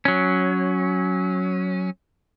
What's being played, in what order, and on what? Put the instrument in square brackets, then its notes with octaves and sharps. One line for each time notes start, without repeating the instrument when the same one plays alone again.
[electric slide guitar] F#3 C#4